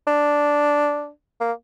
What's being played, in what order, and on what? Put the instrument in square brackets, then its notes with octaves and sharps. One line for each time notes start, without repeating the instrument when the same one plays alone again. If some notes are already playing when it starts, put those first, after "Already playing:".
[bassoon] D4
A#3